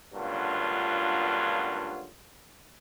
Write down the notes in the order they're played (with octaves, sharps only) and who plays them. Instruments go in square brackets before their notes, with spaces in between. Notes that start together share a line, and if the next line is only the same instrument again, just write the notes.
[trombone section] C#2 G2 A#2 D3 F#3 F4